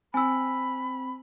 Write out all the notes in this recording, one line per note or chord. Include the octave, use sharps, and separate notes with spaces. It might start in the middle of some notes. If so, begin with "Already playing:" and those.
C4 G#5 B5 E6